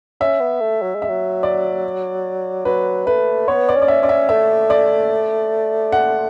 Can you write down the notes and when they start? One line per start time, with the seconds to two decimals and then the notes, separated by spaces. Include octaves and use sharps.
0.20 C#4 E5
0.40 B3
0.61 A3
0.82 F#3
0.95 G#3
1.02 E5
1.09 F#3
1.43 D5
2.65 F#3 B4
3.07 A3 B4
3.48 B3 C#5
3.69 D5
3.75 C#4
3.82 D5
3.88 E5
4.02 C#4 D5
4.09 E5
4.29 A3 E5
4.70 D5
5.92 F#5